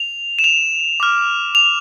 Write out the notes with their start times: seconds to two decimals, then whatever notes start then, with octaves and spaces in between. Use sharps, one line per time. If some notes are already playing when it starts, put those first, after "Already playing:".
Already playing: F7
0.39 E7
0.44 F7
1.00 D6 F6
1.55 F7